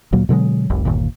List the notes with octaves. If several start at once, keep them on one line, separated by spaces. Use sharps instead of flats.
D2 A#2 F#3 A#3
B2 D3 F#3 G#3
F1 C2 C3
G1 D#2 A#2